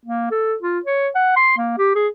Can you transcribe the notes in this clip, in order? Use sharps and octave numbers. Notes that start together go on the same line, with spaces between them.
A#3
A4
F4
C#5
F#5
C6
A#3
G4
G#4